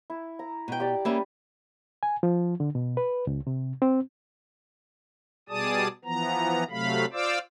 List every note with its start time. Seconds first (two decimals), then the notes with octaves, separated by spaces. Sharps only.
0.10 E4
0.39 A#5
0.68 B2 G5
0.80 G4 D5
1.05 G3 A#3 C#4 B4 E5 G5
2.03 G#5
2.23 F3
2.60 D3
2.75 B2
2.97 B4
3.27 C#2
3.47 C3
3.82 C4
5.49 B2 G3 G#4 D5 A5 D#6
6.04 E3 F3 B3 A#5
6.70 C3 F#3 A3 F5 B5
7.13 F4 C5 D5 F5 D6 E6